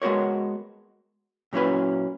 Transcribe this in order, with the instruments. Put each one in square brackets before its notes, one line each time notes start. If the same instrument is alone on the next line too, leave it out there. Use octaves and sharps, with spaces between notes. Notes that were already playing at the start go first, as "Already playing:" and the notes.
[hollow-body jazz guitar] G#3 B3 F#4 A#4 C#5
A#2 F#3 C#4 E4 B4